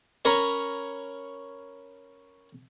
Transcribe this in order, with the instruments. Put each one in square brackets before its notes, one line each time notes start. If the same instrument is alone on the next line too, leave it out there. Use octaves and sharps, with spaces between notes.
[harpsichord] C#4 A#4 C#5 A#5 B5